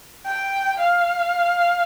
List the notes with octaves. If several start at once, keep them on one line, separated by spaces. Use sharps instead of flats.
G5
F5